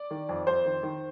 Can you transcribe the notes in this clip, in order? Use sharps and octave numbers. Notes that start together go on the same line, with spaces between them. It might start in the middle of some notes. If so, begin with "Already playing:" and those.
Already playing: D5
D#3
F2
F2 C5
D#3
D#3